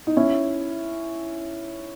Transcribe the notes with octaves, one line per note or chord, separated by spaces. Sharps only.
D#4
C#4 E4